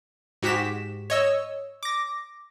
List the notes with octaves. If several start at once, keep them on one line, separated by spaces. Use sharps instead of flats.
G#2 F#4 G4 B6 E7
C#5 D#5 E6
D6 A#6